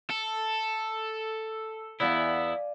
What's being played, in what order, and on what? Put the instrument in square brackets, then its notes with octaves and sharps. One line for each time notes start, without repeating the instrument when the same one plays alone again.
[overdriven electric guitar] A4
[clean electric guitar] E2 B3 E4 [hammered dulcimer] D5 F5 G#5